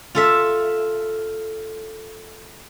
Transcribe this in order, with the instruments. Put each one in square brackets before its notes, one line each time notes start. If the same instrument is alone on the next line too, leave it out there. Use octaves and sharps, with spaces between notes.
[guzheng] F4 A4 E5